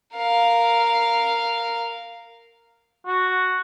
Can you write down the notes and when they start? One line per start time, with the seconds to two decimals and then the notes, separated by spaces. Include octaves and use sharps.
0.16 A#4 F5
3.06 F#4